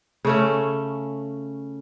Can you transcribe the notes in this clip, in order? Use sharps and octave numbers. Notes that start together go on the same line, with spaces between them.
C#3 A3 C#4